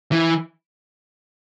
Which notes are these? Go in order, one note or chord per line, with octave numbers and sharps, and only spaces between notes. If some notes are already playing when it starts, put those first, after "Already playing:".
E3